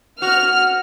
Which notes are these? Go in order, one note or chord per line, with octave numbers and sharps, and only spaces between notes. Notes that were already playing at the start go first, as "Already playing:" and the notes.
F#4 F6